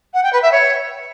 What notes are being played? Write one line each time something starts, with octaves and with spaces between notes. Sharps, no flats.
F#5
G5
B4
E5
C#5